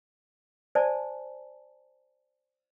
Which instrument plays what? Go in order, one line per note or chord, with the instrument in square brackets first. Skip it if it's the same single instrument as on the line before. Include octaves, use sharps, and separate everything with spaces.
[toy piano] C5 D5 G#5 A5